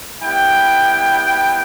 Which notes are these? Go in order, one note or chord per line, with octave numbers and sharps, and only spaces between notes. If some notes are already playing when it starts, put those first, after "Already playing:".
G3 B3 E4 G5